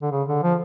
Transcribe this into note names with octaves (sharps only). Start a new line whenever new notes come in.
D3
C#3
D3
F3